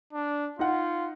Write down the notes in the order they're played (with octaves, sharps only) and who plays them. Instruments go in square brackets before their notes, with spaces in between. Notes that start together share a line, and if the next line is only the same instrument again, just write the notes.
[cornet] D4
[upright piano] D#4 F#5 [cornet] F4